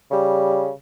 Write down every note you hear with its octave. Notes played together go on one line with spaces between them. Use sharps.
C#3 G3